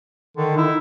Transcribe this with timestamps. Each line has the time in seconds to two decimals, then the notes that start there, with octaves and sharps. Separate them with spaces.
0.37 D3 D#3
0.57 D#4 E4